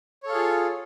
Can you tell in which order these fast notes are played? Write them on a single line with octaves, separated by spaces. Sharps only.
C#5 A4 F5 G#4 F4